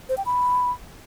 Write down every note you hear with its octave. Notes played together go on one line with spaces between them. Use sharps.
C5
G5
B5